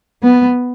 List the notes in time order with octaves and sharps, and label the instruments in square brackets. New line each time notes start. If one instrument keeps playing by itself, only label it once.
[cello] B3